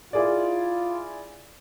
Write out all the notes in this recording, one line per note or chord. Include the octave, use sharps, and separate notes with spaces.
E4 F4 G#4 D5